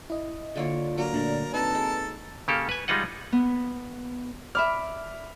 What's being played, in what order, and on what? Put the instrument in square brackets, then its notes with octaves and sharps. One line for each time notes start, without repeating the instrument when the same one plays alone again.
[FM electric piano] E4 D#5
[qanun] D3 A#3 C#5 [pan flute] F4
[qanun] F#3 A#3 D4 [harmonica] A#4
[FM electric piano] A#2 D3 A3 [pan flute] D5
[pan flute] C4 [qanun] D#4 [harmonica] A4 A5 [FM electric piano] B4 A#5
[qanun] G#3
[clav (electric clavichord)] C#3 A#3 G4 A4
B4 G#5
G3 G#3 D#4 F4 D#5 F#5
[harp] B3
[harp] D5 E5 [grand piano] B5 F6